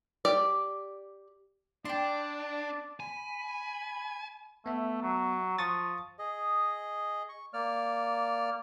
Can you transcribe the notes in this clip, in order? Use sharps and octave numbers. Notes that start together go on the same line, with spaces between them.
G4 D5
D4 D5 G5 A5 C6
G#5 B5
A3 B3 E5
F#3
F3 C#6 D#6 A6
G#4 D#5
C#6
A#3 D5 F6